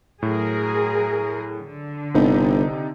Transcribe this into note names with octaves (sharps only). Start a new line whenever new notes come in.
A2 F#3 G#4 A#4
D3
G1 C3 D#4